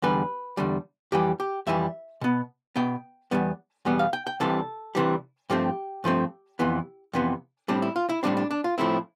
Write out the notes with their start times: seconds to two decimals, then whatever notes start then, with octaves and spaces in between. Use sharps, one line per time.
0.02 E2 D3 G3 B4
0.57 E2 D3 G3
1.12 F2 E3 G3 G4
1.40 G4
1.67 F2 E3 G3 E5
2.21 B2 B3
2.76 B2 B3 G5
3.31 E2 B2 G3 B3
3.85 E2 B2 G3 B3
3.99 F5
4.13 G5
4.27 G5
4.40 C2 C3 E3 G3 A4
4.95 C2 C3 E3 G3
5.50 G2 F3 A3 C4 G4
6.04 G2 F3 A3 C4
6.59 F2 C3 E3 B3
7.13 F2 C3 E3 B3
7.68 A2 G3 C4 D4
7.82 E4
7.96 F4
8.09 E4
8.23 A2 G3 C4 D4
8.37 D4
8.51 D4
8.64 F4
8.78 A2 F3 A3 C4 E4